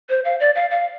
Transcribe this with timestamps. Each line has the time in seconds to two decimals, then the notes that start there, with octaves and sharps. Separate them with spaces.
0.10 C5
0.25 F5
0.40 D5
0.55 F5
0.71 F5